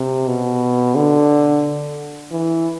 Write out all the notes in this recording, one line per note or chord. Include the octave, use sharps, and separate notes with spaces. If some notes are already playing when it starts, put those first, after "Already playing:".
Already playing: C3
B2
D3
E3